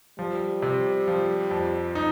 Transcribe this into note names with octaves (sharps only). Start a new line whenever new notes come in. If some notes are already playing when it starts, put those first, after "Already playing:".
F3 G3
C3
F3
F2
D#4